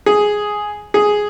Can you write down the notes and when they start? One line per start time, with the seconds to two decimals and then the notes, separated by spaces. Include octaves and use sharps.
0.06 G#4
0.94 G#4